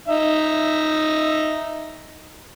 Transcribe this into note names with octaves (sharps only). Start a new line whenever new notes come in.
D#4 E5